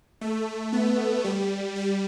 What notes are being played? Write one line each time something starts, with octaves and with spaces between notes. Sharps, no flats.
A3
B3
G3
G3